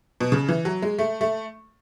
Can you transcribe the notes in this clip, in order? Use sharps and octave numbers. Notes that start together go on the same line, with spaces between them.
B2
C#3
E3
F#3
G#3
A3
A3